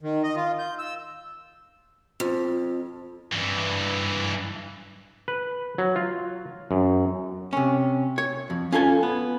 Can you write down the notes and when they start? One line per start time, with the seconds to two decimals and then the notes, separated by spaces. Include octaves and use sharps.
0.01 D#3
0.23 D#5
0.36 F4
0.59 G6
0.79 E6
2.20 F2
3.33 G2 E3
5.28 B4
5.78 F#3
5.96 F4
6.71 F#2
7.53 C3 C#4
8.18 C#5
8.50 F2
8.72 C#4 F4 A4 G#5
9.03 B3